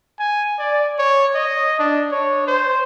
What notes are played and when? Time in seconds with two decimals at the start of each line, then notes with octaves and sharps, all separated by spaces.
0.20 G#5
0.59 D5
0.99 C#5
1.35 D#5
1.79 D4
2.12 C#5
2.48 C5